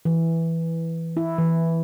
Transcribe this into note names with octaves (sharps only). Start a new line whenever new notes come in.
E3
E4
E3